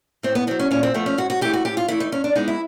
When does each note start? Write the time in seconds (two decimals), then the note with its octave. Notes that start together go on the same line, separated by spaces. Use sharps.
0.23 A2 C4
0.35 B3
0.47 F#3 B3 C4
0.59 C#4
0.71 A#2 C#4
0.83 C4
0.94 F3 A3 B3
1.06 C#4
1.18 G#2 F#4
1.30 F#4
1.41 E3 A3 G4
1.53 F#4
1.65 A2 G4
1.77 F4
1.88 E3 A3 E4
2.00 D#4
2.12 G2 C#4
2.24 D4
2.35 E3 G#3 B3 D#4
2.48 E4